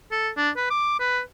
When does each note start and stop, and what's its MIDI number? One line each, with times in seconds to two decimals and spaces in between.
0.11 0.29 69
0.37 0.50 62
0.57 0.68 71
0.70 0.97 86
1.00 1.21 71